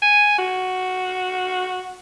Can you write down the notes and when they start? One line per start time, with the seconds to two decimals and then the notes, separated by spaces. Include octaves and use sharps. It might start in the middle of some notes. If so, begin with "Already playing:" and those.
0.02 G#5
0.38 F#4